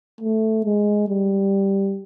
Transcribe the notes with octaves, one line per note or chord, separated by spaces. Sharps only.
A3
G#3
G3